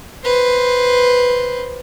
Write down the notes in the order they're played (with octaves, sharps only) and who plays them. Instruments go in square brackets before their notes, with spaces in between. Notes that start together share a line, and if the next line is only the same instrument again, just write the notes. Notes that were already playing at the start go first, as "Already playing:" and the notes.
[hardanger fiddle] B4 C5